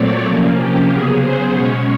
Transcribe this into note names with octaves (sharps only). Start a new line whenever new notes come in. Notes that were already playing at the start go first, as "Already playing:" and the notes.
Already playing: A#2 F#3 A3 C4 C#5 D5
C3 F3 A#3 C#4
G4
C#3 F#3 B3 G#4
C5
B2 G#3 C#4 C#5